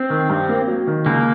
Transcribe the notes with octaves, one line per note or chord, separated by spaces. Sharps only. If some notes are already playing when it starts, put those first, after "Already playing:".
Already playing: C4
D#3
G2
A#3
F#3
D#3
C#2 A#3